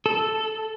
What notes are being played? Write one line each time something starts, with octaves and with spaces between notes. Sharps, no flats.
A4